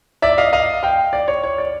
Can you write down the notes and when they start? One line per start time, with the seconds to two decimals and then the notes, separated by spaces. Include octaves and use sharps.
0.22 D5 E5
0.38 D#5 F5
0.53 D#5 F5
0.83 F5 G5
1.13 D5
1.28 C#5
1.44 C#5
1.58 D5